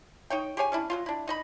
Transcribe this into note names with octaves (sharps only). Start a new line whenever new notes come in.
D#4 C#5 G5
G4 G#4 C#5 G#5
C#4 D4 E4
F#3 A#3 F4
D4 E4
D#4 D#5 B5